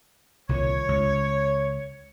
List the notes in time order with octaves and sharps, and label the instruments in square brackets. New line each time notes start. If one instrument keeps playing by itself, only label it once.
[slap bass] C2 A#2 D#3 [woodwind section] C#5
[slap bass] C#2